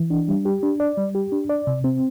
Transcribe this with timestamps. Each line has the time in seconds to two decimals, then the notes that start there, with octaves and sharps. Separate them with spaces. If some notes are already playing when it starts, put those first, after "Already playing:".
Already playing: E3
0.10 D4
0.29 G3
0.45 G4
0.63 D4
0.80 D5
0.98 G3
1.15 G4
1.32 D4
1.50 D5
1.67 C3
1.84 C4